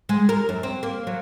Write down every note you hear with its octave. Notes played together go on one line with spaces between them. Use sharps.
G#3
A#4
F#2
C4
A#3
F#3